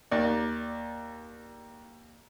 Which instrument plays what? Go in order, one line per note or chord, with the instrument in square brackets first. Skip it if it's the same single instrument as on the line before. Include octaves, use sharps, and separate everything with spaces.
[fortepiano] D#2 D5